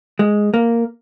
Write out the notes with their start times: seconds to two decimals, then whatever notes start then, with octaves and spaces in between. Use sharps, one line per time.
0.19 G#3
0.54 A#3